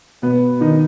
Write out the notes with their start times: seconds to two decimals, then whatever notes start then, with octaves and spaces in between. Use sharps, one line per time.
0.22 B2 B3
0.61 D#3 D#4